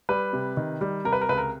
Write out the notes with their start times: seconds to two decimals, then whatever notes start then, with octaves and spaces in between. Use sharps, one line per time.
0.09 G3 B4
0.33 C3
0.57 D#3
0.81 G3
1.05 C3 A#4
1.13 B4
1.21 A#4
1.29 C#2 B4
1.38 A#4